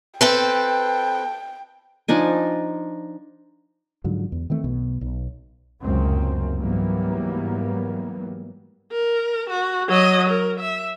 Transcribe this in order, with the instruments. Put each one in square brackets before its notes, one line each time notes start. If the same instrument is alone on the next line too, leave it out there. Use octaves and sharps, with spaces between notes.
[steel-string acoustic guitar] C4 A4 B4 [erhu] G5
[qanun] F3 D4 D#4 G#5
[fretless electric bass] G#2 D3 F3 F#3
E2
D#3 E3 A3 C4
B1 B2
B1
[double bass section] F1 C#2 F#2 A#3 C4
G#2 E3 F#3 G3 A#3 B3
[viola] A#4
F#4
F#3 D#5
A#4
E5